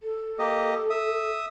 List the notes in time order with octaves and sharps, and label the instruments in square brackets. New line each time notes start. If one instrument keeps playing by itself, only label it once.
[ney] A4
[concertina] A#3 G4 D#5
E5 D#6